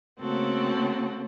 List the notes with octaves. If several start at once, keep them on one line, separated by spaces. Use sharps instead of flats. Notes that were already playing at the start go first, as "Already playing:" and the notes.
C#3 A3 A#3 C4 F#4 A4